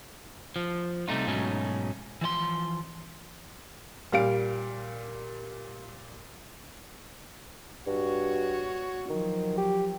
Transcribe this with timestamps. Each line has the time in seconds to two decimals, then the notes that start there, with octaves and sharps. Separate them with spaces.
0.56 F3
1.08 C3 G3 A3 D#4 F4
1.27 G#2 B2 F#3 A3 C#4 D#4
2.21 E3 F3 D5 C6
4.12 A#2 G3 F5 D7
7.87 G2 F#4 C#5
9.09 D#3 F3 F#3
9.58 G4